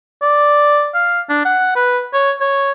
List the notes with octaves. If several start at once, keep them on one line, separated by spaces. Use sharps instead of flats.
D5
F5
D4
F#5
B4
C#5
C#5